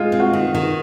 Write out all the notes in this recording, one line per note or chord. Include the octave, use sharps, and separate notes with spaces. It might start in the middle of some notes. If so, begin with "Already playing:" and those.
Already playing: G#3 D#4 F4
C4
F#4
D#3
D#3